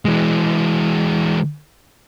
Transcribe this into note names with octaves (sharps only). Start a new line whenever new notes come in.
E3 G#3